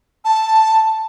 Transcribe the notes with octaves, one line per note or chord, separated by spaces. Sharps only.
A5